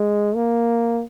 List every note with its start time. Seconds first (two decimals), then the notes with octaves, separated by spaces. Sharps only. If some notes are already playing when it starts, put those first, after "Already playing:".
Already playing: G#3
0.35 A#3